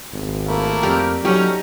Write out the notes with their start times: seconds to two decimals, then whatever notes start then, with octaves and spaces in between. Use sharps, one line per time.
0.13 G#1
0.46 A3 A#3 E4
0.83 F2 G4 A#4 D5
1.25 F#3 G3 C#4 D#4 G4 A4 A#5